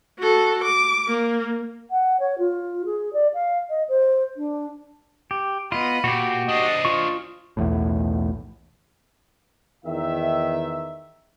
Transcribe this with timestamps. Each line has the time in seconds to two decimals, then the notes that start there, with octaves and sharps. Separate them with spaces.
0.19 F#4 A4
0.63 D6
1.08 A#3
1.90 F#5
2.19 C#5
2.38 F4
2.85 G#4
3.13 D5
3.33 F5
3.69 D#5
3.88 C5
4.36 D4
5.31 G4
5.72 B3 F4 D#5 B5
6.04 A#2 F#4 G4
6.49 D4 C5 D#5
6.85 F4 C#6
7.57 B1 E2 A2
9.85 E2 D#3 E5